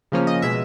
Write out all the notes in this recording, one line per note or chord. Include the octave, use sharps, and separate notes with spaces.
C#3 F3 A#3 C#4
D#5
B2 G#3 E5